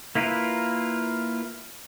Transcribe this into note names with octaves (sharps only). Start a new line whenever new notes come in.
A#3 E4 F4 A#4 B4